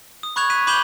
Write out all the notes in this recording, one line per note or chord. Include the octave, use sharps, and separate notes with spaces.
D#6
B5 C#6 F#6 G#6 F7
F#6 B6 D#7
B5 D6 G6 E7 F#7 G7